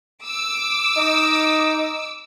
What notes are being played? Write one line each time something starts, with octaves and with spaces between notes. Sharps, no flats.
D6 E6
D#4